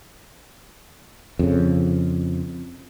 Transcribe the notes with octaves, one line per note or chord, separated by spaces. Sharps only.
F2 C#3